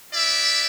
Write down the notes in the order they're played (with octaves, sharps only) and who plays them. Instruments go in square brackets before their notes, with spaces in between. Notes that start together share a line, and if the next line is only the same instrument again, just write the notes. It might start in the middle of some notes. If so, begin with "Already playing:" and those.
[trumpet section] B3 E4 G4 D5 E5